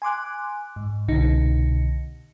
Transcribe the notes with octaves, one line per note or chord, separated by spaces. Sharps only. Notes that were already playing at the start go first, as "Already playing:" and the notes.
G#5 C6 D6 F#6
G#2
C2 B2 D3 D#4 C#7